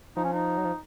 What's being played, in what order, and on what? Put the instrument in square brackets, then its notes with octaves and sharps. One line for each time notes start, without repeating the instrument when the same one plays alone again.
[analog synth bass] F3 [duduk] D#4
[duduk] C#4
D#4
[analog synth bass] F#3
F3